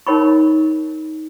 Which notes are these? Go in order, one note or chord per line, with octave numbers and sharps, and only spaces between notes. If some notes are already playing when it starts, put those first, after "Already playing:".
D#4 A#4 C#5 G5 B5 C#6